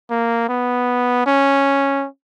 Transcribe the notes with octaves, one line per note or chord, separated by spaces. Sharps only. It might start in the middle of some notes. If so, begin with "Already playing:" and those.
A#3
B3
C#4